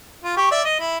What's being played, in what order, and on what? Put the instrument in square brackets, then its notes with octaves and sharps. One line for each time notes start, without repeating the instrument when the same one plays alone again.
[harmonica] F4
G4 C#6
D5 E5
D#5
E4